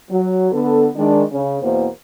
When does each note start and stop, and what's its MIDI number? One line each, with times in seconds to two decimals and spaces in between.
0.11 0.51 54
0.52 0.88 50
0.52 0.88 59
0.52 0.88 69
0.96 1.23 51
0.96 1.23 56
0.96 1.23 62
1.32 1.57 49
1.62 1.87 40
1.62 1.87 47
1.62 1.87 52
1.62 1.87 58
1.62 1.87 72